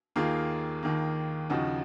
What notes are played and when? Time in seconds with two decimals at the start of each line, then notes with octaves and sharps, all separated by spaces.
0.16 D#2 D#3 A#3 F4 G#4
0.83 D#2 D#3 A#3
1.50 D#2 C#3 F3 D#4 F#4